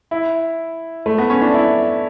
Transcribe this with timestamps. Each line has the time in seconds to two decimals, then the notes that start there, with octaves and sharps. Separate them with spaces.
0.11 E4
1.06 A3
1.18 B3
1.30 C#4
1.42 D4
1.54 E4